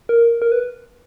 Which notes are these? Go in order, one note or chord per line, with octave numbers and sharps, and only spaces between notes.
A#4
A#4
B4